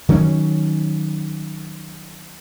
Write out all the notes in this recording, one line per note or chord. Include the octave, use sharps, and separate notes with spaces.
D#3 F#3 A#3 C#4